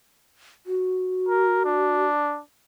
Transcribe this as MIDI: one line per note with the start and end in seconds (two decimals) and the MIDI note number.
0.66 2.05 66
1.29 1.63 70
1.65 2.40 62